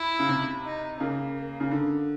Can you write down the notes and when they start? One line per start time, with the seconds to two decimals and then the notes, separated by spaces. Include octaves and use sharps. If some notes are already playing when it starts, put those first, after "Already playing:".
Already playing: E4
0.19 C#3
0.28 C3
0.64 D#4
1.00 C#3 A#3
1.36 A#3
1.60 C#3
1.71 D3